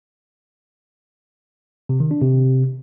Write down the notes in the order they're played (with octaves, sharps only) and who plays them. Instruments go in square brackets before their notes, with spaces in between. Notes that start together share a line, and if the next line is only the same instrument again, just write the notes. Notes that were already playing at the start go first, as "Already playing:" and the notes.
[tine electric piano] C3
D#3
D4
C3